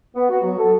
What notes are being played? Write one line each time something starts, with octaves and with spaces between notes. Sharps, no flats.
B3
F#4
F#3
A4